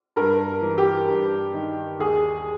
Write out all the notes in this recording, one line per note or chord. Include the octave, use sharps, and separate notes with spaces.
G2 A#4
E3
G4
G2
D#3
D#2 G#4